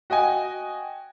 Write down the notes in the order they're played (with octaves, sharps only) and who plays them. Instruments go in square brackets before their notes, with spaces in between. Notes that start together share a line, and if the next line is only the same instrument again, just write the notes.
[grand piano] F#4 D#5 G5 G#5